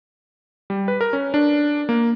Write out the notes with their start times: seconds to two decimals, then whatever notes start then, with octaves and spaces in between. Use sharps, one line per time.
0.70 G3
0.88 B4
1.01 A#4
1.13 C#4
1.34 D4
1.89 A#3